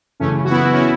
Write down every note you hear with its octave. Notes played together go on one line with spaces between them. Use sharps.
F#2 C#3 E3 A3 C#4
F#4
B3 E4
C#4
E4